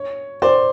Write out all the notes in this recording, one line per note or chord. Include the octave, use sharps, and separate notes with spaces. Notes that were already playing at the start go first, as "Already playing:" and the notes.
Already playing: C#5
C5 D5